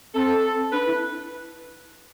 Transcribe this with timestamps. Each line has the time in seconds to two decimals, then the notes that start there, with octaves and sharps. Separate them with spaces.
0.14 C4 A4
0.72 D4 B4
0.86 E4